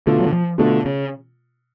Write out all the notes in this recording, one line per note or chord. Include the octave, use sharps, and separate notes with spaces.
B2 D3 A3 F4
F#3
D3
F3
B2 D3 A3 F4
C#3